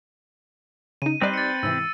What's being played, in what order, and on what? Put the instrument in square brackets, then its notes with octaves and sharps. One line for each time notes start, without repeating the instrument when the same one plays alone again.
[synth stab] C#3 D#4 [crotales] D#7
[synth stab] G3 D#4 D5 [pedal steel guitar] C4 B4 C5
[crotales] A6 C#7
[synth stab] G#2 C3 E3 [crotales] E6 A6